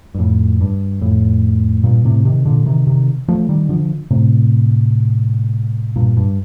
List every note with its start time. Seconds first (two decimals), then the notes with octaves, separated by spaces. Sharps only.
0.15 G2
0.19 F2 A2
0.61 G2
1.01 F2 A2
1.84 G2 A#2
2.05 A2 C3
2.25 C3 D#3
2.45 A#2 D3
2.66 C3 D#3
2.87 C3 D#3
3.28 F3 A3
3.49 D#3 G3
3.69 D3 F3
4.10 A2 C3
5.96 G2 A#2
6.17 G2